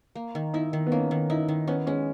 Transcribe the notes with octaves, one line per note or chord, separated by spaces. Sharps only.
A#3
D#3
D#4 E4
D#3
B3
A#3 C#4
D#3
D#4 E4
D#3
B3 C#4
G#3 C#4